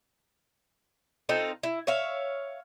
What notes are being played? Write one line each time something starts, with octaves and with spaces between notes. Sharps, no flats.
C4 D#4 F4 A4
E4
C#5 E5 F5